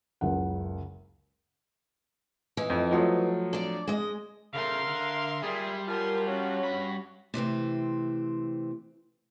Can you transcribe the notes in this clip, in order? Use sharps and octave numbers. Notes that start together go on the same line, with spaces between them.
F#1 C#2 F#5
E3 D#4
F2
F3 F#3 A3
D4 D5
G#3 D#5
C#3 A3 A#4 E5 F5 C6
D3
A#2 G3 G#4
F3 F#3 F4 A#4 G#5 C6
C#4 F#4 C#5
G2 B5
C3 E3 A3 C4